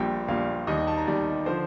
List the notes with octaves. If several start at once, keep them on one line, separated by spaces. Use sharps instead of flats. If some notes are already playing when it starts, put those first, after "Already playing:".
Already playing: A#1 A#2 G3 G5
A#1 A#2 G3 F5
D#2 D#3 G3 D#5
D#5
A5
A#5
D#2 D#3 G3 D5
D3 F3 C5